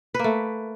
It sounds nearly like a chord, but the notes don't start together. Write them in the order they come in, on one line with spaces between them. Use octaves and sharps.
B4 A#3 A3